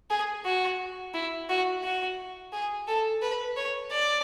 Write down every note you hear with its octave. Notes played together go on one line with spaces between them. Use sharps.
G#4
F#4
E4
F#4
F#4
G#4
A4
B4
C#5
D5